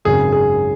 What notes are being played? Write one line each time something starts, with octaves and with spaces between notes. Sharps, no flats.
G#1 F#2 C#3 G#4
G#4